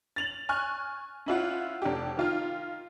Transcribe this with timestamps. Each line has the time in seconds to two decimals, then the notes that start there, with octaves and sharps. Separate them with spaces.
0.16 A6 F7 F#7
0.49 G#5 C#6 F6 F#6
1.26 C#4 E4 F4 F#5
1.82 F1 D4 G4
2.17 D#3 F4 F6